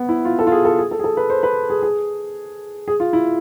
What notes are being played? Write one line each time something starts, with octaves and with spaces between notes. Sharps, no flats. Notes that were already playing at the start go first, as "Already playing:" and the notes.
Already playing: B3
E4
F4
A4
F4
G#4
A4
G#4
A4
G#4
A4
B4
C5
B4
G#4
G#4
G#4
F4
E4